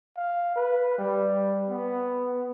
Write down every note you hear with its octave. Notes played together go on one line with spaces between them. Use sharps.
F5
B4
G3
B3